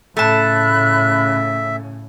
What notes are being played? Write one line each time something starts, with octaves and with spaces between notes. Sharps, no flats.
A2 C#3 A3 E5 A5 B5 F#6